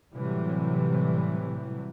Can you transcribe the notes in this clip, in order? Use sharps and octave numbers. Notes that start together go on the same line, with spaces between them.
A2 C3 E3 F#3 G3